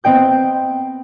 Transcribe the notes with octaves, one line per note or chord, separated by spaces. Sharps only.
B3 C4 D#5 G5 G6